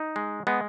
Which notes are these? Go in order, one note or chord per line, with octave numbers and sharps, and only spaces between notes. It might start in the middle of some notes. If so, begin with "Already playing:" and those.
Already playing: D#4
G#3
G#3 B3